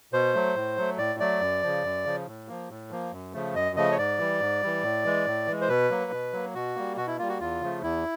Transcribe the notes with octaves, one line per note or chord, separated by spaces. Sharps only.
B2 C5
F#3 A3
A2
F#3 A3
A2 D5
F#3 A3 D5
F#2
C#3 F3
F#2
C#3 F3
A2
F3 A#3
A2
F3 A#3
F#2
C#3 F3 A3
F#2 D#5
C#3 F3 A3 D#5
C#5
G#2 D5
E3 G3
G#2
E3 G3
A2
E3 G#3
A2
E3 G#3
C5
B2 B4
F#3 A#3
B2
F#3 A#3
B2 F#4
G3 A#3
B2 F#4
E4
G3 A#3 F4
F#4
E2 F4
C#3 F3 A3
E2 E4